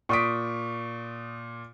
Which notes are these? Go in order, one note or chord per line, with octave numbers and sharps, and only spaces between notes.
A#2 C#6 D#6 B6 D7